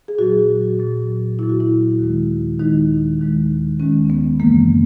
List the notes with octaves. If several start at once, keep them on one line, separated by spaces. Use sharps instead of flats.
G#4
A#2 F#3 F#4
A#2 F#3
A#2 F#3 E4
F#4
E4
D#2 D#3 G#3
D#2 D#3 G#3 D#4
D#2 D#3 G#3
D#2 D#3 G#3 C#4
B3
F#2 C#3 E3 G#3 A#3